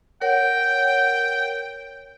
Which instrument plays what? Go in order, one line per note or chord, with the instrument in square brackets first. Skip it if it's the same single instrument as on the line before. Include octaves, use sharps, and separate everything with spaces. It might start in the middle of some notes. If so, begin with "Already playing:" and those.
[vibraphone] A#4 C#5 F#5 [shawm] G5